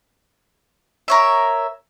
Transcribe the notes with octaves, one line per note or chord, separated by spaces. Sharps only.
A#4 C#5 E5